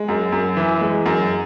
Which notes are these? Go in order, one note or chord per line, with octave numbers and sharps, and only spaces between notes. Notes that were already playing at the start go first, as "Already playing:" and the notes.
Already playing: G#3
F#2
F#2
E3
G#3
F#2